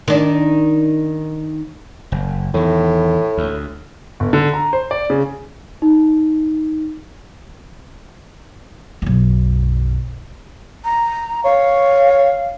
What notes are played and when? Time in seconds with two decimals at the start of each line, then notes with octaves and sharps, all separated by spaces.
0.08 D#3 D4
2.12 F#1
2.54 E2 A2 D#3
3.37 D2
4.20 G1
4.33 D3
4.54 A#5
4.73 C5
4.91 D5
5.10 C#3
5.82 D#4
9.02 B1 F#2
10.84 A#5
11.44 C#5 F5